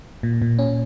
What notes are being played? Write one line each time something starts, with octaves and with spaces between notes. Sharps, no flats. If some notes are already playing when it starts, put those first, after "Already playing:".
A#2
A#2
C#4